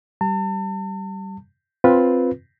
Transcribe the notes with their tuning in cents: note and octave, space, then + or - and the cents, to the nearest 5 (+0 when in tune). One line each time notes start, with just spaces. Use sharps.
G3 -15 A5 +40
C4 +0 F4 +10 B4 -5